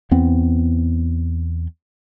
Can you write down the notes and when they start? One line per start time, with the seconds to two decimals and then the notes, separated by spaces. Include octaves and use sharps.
0.11 E2 B3 C4